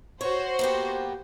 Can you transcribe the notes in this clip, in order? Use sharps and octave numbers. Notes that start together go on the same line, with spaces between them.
F#4 C5 C#5
A#3 B3 G4